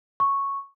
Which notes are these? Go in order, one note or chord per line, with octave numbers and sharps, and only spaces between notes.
C#6